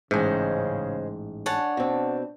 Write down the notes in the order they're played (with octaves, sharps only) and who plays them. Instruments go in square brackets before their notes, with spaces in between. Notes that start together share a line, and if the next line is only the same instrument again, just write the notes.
[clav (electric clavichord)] A1 G#2 [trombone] C#3 [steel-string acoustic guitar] G#3 C5
[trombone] D4 [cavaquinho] C#5 F#5 A5 [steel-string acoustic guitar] G#5
[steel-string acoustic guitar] B2 C4